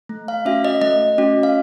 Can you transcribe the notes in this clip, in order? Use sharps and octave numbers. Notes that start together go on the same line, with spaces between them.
A3
F5
C#4 F#4 E5
D#5
A3 D#5
C#4 F#4
F5